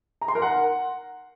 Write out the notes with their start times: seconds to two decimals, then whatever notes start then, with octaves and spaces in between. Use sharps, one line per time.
0.22 A#5
0.28 C6
0.35 A#4
0.42 F#5